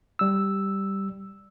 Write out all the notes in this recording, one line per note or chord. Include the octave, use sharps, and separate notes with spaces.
G3 E6